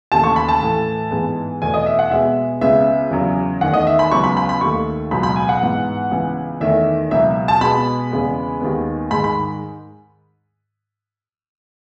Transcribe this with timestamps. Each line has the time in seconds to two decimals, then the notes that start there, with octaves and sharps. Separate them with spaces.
0.12 D#2 C#3 E3 A3 A5
0.24 C#6
0.36 B5
0.48 A5
0.62 A2 E3 A3
1.11 G#2 E3 G#3 B3
1.62 E2 B2 A3 G#5
1.74 D#5
1.86 E5
1.99 F#5
2.11 B2 G#3 B3 E5
2.61 C#2 C#3 G#3 B3 E5
3.11 E2 C#3 F#3
3.61 E2 D#3 A3 F#5
3.73 D#5
3.87 E5
3.99 B5
4.12 C#2 C#3 F#3 B3 C#6
4.24 B5
4.37 B5
4.49 B5
4.61 D#2 D#3 A3 C#6
5.11 C#2 B2 F#3 B5
5.23 B5
5.36 G#5
5.49 F#5
5.61 G#2 E3 B3
6.11 C#2 C#3 E3 B3
6.61 E2 D#3 A3 E5
7.11 C#2 B2 F#3 E5
7.48 A5
7.61 B2 G#3 B3 B5
8.12 E2 C#3 G#3 B3
8.61 D#2 D#3 G#3 B3
9.10 G#2 D#3 G#3 B5
9.24 B5